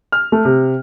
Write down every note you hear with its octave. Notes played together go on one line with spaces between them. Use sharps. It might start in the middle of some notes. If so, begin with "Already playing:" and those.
F6
A3
C3